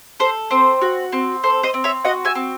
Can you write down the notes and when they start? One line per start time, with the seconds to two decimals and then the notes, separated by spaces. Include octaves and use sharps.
0.20 A4 C5
0.51 C4 C5
0.82 F#4
1.12 C4
1.44 A4 C5
1.63 C5 D#5
1.74 C4
1.84 C#5 E5
2.04 F#4 D#5 F#5
2.25 E5 G#5
2.35 C4